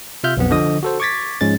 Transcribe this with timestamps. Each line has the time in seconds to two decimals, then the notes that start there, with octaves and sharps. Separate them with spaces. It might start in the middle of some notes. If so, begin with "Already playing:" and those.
0.24 C3 F4 E5 F6 G6
0.37 B1 F2 B3
0.51 D3 F3 D#5 D#6
0.83 F#4 A4 C5
1.00 C#6 D6 G#6 A6 B6
1.41 G#2 F3 G#3 C#4 A6